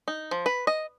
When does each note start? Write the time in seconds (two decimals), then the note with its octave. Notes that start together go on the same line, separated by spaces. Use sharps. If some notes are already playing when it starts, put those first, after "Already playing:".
0.08 D#4
0.31 F3
0.46 B4
0.67 D#5